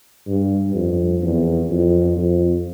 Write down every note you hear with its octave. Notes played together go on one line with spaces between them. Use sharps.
G2
F2
E2
F2
F2